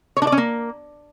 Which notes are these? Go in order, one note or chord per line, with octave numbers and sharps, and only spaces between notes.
C#5
D4
D5
C#4
A#3